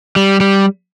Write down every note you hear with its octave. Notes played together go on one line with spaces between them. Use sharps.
G3
G3